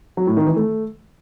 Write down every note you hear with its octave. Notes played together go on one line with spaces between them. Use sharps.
F#3
A2
D#3
E3
A3